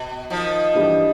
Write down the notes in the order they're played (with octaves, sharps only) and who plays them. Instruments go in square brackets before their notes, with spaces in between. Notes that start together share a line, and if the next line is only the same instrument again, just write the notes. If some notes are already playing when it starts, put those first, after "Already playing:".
Already playing: [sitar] B2
D#3 F3
[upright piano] G2 E3 G3